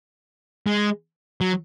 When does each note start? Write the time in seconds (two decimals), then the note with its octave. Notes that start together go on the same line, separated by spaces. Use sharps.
0.66 G#3
1.41 F#3